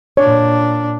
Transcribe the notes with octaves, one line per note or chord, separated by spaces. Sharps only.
A#2 D4 C#5